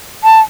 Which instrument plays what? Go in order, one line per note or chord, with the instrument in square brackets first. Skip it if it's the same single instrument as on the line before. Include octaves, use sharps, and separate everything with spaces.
[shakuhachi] A5